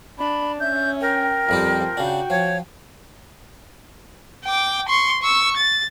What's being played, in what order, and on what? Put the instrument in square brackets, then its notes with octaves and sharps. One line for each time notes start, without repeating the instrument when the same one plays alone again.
[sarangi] D4 [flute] B5
[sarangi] C#4 [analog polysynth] E5 [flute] G6
[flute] A#4 [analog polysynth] G5
[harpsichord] F2 G3 G4 [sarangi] F3
[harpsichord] C#3 D4 [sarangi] F#4
[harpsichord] F3 [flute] C#5
[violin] G5 D6
C6 C#6
C#6 E6
A6